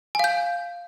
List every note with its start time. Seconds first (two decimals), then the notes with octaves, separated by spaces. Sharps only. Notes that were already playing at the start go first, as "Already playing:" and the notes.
0.15 G#5
0.19 F5
0.24 G6